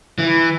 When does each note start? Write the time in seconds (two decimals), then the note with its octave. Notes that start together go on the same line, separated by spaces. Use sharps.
0.18 E3